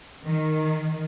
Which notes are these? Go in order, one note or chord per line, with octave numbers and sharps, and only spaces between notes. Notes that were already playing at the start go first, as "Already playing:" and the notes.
D#3